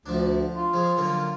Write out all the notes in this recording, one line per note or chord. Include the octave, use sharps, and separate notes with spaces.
D2 F3 D4
F4
F3 G#3
F#2 D3 A#3